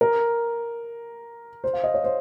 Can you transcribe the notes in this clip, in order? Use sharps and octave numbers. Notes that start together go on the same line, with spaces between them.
A#4
C5
F5
D#5
C#5
C5